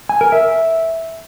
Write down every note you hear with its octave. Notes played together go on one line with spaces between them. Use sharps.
G#5
A#4
E5